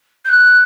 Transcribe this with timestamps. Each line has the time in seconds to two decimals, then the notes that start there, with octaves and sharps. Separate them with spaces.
0.25 G6
0.29 F#6